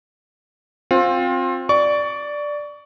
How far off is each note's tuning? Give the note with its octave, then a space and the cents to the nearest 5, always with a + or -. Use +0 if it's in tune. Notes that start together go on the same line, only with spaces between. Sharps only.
C4 +15 F4 +25
D5 +0 C#6 +25